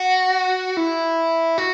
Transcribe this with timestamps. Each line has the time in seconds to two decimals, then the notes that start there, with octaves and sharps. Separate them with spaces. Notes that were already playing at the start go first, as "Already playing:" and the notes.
Already playing: F#4
0.77 E4
1.58 F#4